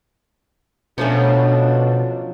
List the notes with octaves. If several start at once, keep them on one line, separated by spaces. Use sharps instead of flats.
B2 F3 F#3 A3 C#4 D4